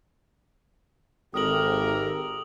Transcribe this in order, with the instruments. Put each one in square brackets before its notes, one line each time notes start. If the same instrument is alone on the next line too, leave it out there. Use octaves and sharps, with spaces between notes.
[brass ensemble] G#1 [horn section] G4 A#4 [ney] A4 [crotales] D#6 F#7